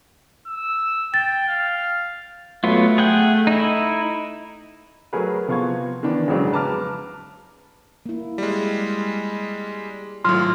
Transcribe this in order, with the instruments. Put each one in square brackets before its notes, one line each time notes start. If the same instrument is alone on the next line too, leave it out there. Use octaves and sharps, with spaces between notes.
[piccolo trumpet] E6
[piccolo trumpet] G5 [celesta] A6
[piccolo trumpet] F5
[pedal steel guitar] F#3 B3 F4 [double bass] A3
[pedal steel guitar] G#4 F#5 G5
D#4 E4
[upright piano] F#3 A3 G#4 A#4 B4
C3 F3 B3 F5 C#6 G#6
D#3 E3 B3 D4
F2 G#2 C#3 F#3 G#3 D4
B4 A5 A#5 D6 F6
[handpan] A#3 E4
[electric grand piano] G3 G#3
[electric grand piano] G#1 A2 [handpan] F#3 F4 [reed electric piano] C6 F6